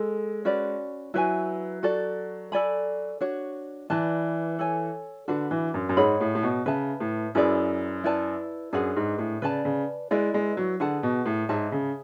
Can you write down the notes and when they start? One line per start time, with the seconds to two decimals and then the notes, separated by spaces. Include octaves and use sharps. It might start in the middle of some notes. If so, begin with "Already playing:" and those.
Already playing: G#3 A4
0.45 C#4 F#4 B4 D5
1.14 F#3 E4 B4 E5 G#5
1.83 F#4 A4 D5
2.52 A4 D5 G#5 B5
3.21 D4 F#4 C#5
3.90 E3 B4 D5 A5
4.59 A4 C#5 G#5
5.28 D3 D4 F#4 B4
5.51 E3
5.74 F#2
5.89 F#2
5.97 G#2 G#4 C#5 F#5 B5
6.21 A2
6.35 A2
6.43 B2
6.66 C#3 B4 E5 A5
7.00 A2
7.35 F#2 E4 G#4 B4 D5
8.04 E4 B4 D5 A5
8.73 F#2 D4 G#4 B4 F#5
8.96 G#2
9.18 A2
9.42 C#3 B4 D5 A5
9.65 C#3
10.11 G#3 E4 B4 D5
10.34 G#3
10.57 F#3
10.80 D3 G#4 B4 F#5 A5
11.03 B2
11.26 A2
11.49 G#2 G#4 C#5 E5 A5
11.72 C#3